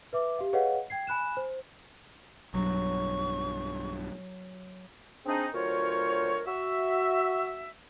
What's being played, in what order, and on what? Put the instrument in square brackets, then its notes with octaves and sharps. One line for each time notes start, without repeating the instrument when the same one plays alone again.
[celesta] B4 E5 D6
G4 F5
G#4 B4 C#5 D#5 F5 F#5
G5 G#6 C7
G#5 B5 F#6 E7
C5
[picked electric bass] B1 G2 [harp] F#3 [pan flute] C#6
[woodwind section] C4 D4 D#4 G#4
D2 F#3 F4 A#4 C5 C#5
F#4 E5